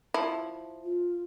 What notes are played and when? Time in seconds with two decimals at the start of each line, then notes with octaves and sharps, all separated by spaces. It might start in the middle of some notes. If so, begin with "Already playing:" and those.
0.14 F3 E4
0.84 F4